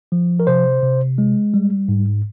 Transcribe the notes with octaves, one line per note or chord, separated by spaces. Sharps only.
F3
A#4
C3 C5
C3
G#3
G3
G#2